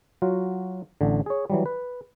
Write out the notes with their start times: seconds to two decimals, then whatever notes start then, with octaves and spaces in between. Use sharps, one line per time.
0.22 F#3 F4 F#4
1.01 A1 D3
1.26 G#4 C#5
1.50 E3 F#3 G3
1.66 B4